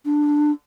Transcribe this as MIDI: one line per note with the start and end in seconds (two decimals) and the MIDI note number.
0.05 0.51 62